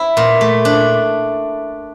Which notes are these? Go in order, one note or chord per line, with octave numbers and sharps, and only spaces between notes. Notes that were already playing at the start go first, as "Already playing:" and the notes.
Already playing: E4
A#2
A3
D4